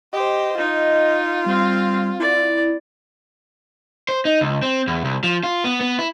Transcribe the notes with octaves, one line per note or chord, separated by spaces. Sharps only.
G4 C5 D#5
D#4 F4
G3 C4 F5
E4 D5
C5
D#4
C#2
C4
E2
C2
F3
F4
B3
B3
E4